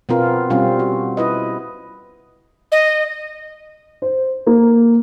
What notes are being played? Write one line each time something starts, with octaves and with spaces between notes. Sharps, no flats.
B2 B3 C4 F4 A#4
B2 G3 C4 C#4 F4
F#4
E4 B4 D#5
D#5
C5
A#3